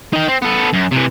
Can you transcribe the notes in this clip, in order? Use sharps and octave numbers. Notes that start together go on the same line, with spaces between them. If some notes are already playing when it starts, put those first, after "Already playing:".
D#4 G5
C4
B3 A4
F#2
C3 E3